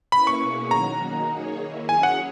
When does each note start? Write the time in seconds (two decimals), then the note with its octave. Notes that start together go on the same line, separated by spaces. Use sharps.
0.12 A#3 C#4 E4 B4 B5
0.27 C#6
0.41 B2 A#3 C#4 G#4
0.71 D#3 F#3 C#4 F#4 A#5
1.00 D#3 A#3 D#4 F#4
1.30 A#3 D#4 G#4 C#5
1.59 D#3 A#3 E4
1.89 F#3 C#4 G#4 C#5 G#5
2.03 F#5